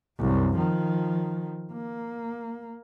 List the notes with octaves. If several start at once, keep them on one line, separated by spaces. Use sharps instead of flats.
C2 F#2
D#3 F3
A#3